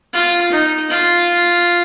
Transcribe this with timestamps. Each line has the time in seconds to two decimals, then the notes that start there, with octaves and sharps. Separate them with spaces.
0.13 F4
0.51 D#4
0.90 F4